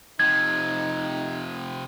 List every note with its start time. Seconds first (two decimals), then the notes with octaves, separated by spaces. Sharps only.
0.20 C3 F3 D#4 G#6